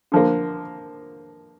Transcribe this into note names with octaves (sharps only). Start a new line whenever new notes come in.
D3 F3 A#3